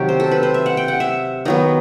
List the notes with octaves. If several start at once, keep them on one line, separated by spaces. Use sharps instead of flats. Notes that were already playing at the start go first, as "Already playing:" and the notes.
Already playing: C3 D#3 F#3 G4
C5
A4
B4
C5
E5
F#5
G5
F#5
E5
D#3 F#3 B3 D#5